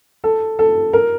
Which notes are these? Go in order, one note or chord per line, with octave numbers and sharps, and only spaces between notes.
A4
A4
A#4